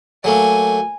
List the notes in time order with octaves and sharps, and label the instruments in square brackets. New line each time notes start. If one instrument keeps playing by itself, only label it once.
[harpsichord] F#3 A3 A#3 [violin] G#5